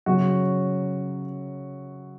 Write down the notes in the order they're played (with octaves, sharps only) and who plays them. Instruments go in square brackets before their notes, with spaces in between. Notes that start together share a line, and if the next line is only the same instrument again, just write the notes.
[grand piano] F#2 C#3 F#3 F#4